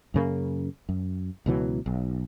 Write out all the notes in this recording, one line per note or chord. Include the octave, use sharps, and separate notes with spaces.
F#2 C#3 A#3
F#2
C#2 B2 E3 F#3
B1